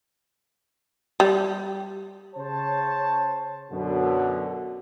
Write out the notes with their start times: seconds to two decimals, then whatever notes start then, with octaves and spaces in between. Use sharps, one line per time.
1.20 G3
2.36 C#3 C5 C#5 A5
3.71 F#2 B2 D3